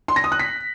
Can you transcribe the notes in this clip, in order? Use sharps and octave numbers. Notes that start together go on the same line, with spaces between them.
C6
A#6
D#6
F#6
B6